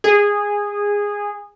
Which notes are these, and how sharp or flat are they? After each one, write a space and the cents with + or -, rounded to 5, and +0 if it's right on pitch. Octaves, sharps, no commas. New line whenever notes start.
G#4 -15